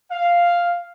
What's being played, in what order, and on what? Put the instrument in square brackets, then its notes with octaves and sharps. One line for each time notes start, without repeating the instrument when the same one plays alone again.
[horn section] F5